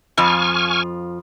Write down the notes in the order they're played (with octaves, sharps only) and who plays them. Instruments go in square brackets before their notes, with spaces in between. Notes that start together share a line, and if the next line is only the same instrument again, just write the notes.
[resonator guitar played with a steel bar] F2 F3 [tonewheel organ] G#5 C#6 F6